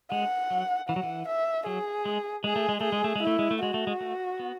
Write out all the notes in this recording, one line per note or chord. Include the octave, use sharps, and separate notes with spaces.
G#3 F#5
F#3
E3 F#5
F#3
E3
E5
F#3 G#4
G#3
G#3 G#4
A3
G#3
A3 G#4
G#3
A3
G#3
A3 E4
G#3
A3
G#3 F#4
A3
G#3
A3
B3